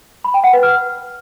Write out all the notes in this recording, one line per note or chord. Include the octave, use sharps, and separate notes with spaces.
B5
G5
F#5
B4
F6